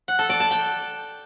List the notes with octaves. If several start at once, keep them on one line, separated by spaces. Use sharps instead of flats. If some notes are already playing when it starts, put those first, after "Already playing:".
F#5
A4
D5
A5
G5